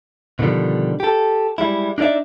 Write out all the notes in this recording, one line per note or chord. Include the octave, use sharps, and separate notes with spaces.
B2 D3 D#3 F3 G3
G4 A4
G3 G#3 E4
D4 D#4 G#4 D5 E5